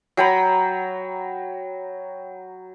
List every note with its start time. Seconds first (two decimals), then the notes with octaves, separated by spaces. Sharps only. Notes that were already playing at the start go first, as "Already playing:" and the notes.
0.17 F#3 G5 A#5 B5